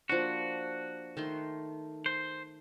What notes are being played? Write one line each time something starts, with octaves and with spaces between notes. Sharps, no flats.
F3 A#3 D4 F#4
D#3 A3 C6
C5